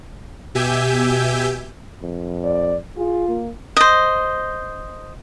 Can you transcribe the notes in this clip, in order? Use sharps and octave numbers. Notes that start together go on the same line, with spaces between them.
B2 G4 E5 G#5 G6
F2
D5
F4 G#4
A#3
C5 D#5